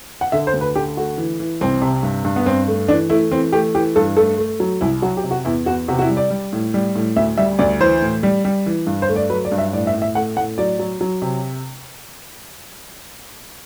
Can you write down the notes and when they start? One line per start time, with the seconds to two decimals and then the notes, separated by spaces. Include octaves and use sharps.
0.21 F#5
0.32 D3 E5
0.47 C5
0.54 D2
0.61 B4
0.76 D3 G4
0.97 A3 F#4
1.18 E3
1.40 E3
1.61 C2 C4
1.82 C3
2.03 G2
2.25 G2
2.36 B3
2.46 G2 C4
2.68 A3
2.88 E3 D4
3.10 A3 E4
3.31 E3 C4
3.52 A3 G4
3.75 E3 G4
3.96 G2 A4
4.17 A3 A4
4.38 A3
4.60 F#3
4.81 C2 E4
5.02 F#3 F#4
5.17 G4
5.24 C3
5.31 F#4
5.45 E2 E4
5.66 E2 F#4
5.88 C3 F#4
5.99 F#4
6.02 E4
6.09 G3
6.17 D5
6.30 G3
6.53 A2
6.74 G3
6.96 A2
7.16 D2 E5
7.38 G3 E5
7.59 D2 D5
7.80 E3 C5
8.02 A2
8.23 G3
8.45 G3
8.66 E3
8.87 G2
9.02 C5
9.09 A3
9.16 D5
9.30 F#3 B4
9.45 D5
9.52 G2
9.58 E5
9.73 A2 D5
9.87 E5
9.94 A2
10.02 E5
10.15 A3 F#5
10.37 A2 F#5
10.58 F#3 D5
10.79 F#3
11.01 F#3
11.22 C3